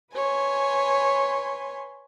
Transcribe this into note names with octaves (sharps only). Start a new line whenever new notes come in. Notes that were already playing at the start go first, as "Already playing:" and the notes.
B4 C#5 G#5 C6